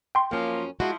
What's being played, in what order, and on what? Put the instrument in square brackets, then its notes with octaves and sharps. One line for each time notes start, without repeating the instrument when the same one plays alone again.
[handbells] G5 C6
[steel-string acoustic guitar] F#2 C#4 [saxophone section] F3 A#3
[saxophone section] F3 E4 [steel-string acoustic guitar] G#3 F#4